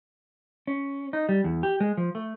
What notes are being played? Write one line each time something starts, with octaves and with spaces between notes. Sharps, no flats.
C#4
D#4
G3
E2
G4
G#3
F3
A3